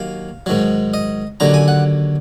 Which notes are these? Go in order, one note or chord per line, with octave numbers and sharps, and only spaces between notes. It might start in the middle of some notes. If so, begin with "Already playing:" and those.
Already playing: D#2 D#3 F#3 F5
G#2 D#3 F#3
D#5
D#2 D3 F#3 A#5
G#5
F#5